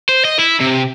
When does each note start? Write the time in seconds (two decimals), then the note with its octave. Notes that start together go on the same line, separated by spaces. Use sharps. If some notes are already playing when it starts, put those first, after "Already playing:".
0.09 C5
0.25 D#5
0.40 E4
0.61 C3